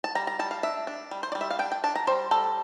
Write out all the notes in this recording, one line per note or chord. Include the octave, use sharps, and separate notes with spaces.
A5
G3 A#5
A#5
G3 A5
F5
D4 E5
D4
G3
C5
D5
G3
E5
F5
D4 G5
G5
D4 A5
A#5
G3 C5
G3 A4